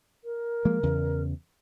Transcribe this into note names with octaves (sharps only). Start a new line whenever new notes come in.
A#4
F3 G#3 A#3
E2 C#3